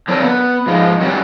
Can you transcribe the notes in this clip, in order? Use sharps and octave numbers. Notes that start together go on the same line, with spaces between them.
D3 F#3 G3 C4 A4 A#4
B3
G#2 F3 G#3
F#3 G3 C4 C#4